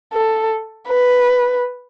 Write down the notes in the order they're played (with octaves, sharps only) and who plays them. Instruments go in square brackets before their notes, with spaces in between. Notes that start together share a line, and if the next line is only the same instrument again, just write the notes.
[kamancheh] A4
B4